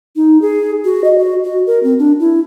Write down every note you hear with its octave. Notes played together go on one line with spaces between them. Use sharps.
D#4
G#4
F#4
D#5
F#4
F#4
A#4
C4
D4
E4